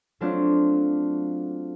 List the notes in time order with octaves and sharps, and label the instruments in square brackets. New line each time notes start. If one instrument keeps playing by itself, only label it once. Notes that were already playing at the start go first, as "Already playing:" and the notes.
[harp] F#3 A3 C4 D4 F4